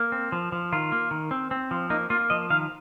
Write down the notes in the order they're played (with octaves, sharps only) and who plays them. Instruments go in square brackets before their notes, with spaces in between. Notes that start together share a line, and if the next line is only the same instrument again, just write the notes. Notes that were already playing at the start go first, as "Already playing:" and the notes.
Already playing: [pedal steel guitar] A#3
C4
F3
F3
D#3 F4
A#3
D#3
C4
C4
F3
A#3 D#4
A#3 F4
F3 D#5
D#3 F5